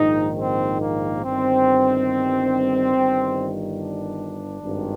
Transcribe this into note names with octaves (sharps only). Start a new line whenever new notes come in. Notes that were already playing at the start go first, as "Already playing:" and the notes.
Already playing: A#1 G#2 D#3 D#4
C4
A#3
G1 G2 D#3 C4
G1 G2 D#3
D4
G#1 G2 D#3